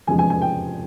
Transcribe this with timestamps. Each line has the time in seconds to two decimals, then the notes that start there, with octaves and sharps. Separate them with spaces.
0.07 F1 E2 C#3 F3 G#3 G#5
0.19 G#5
0.30 G#5
0.42 G5